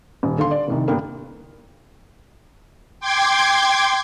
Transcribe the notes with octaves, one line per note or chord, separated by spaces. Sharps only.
D#1
D3 F5 C6
D5
F1 C2 D#3
G2 D3 A#3 B3
G5 C6 D6 G#6